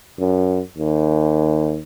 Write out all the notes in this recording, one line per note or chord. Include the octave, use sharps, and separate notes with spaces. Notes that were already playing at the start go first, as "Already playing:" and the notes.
F#2
D#2